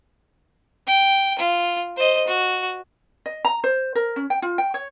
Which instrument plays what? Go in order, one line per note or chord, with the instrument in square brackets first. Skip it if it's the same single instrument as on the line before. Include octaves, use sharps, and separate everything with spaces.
[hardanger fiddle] G5
F4
C5 D#5
F#4
[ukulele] D#5
A#5
C5
A#4
C#4
G5
F4
G5
C#5